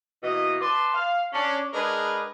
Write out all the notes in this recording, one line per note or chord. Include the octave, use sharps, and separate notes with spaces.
B2 E3 A#3 D#5
B4 D5 A5 C6
F5
C#4 D4
G#3 D4 G#4 A#4 B4